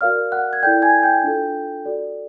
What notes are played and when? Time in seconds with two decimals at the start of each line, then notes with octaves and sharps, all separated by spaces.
0.01 F#4 A#4 D5 F5 F6
0.32 F#5 F#6
0.53 G#6
0.63 E4 A4 D5 G5 G6
0.82 G#5 G#6
1.03 G5 G6
1.23 D4 F4 A4
1.85 F#4 A4 D5